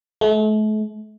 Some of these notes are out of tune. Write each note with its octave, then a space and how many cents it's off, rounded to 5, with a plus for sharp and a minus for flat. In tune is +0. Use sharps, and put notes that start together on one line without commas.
A3 -40